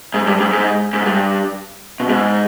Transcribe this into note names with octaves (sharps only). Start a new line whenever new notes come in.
G#2
G2
G#2
G#2
G#2
G2
B2
G#2